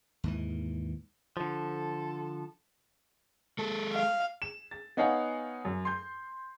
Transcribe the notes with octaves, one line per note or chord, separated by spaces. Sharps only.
D#2 G#2 E3
D3 F3 A4
G#3 A4
F5
E7
A6
B3 D#4 C#5 F5 F#5 G#5
F#2
C6 G6